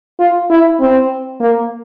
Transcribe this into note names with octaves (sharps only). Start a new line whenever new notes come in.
F4
E4
C4
A#3